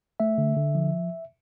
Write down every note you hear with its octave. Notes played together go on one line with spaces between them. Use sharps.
A3 E5
D3
D3
F3